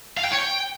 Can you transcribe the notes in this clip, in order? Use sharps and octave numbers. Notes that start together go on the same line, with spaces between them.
F5
G5
C#5
G5